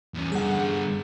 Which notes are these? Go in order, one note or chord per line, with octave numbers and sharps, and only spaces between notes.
E2 C#4
G2 D3 G#4 F#5